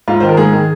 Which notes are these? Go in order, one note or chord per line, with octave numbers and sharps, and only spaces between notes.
G#2 F4
D#3 C5
A#4
G#2 G#4
D#3